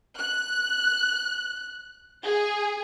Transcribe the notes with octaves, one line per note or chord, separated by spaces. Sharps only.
F#6
G#4